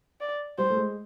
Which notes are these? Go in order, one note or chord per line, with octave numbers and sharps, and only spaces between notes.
D5
G3 C5
A3
G#3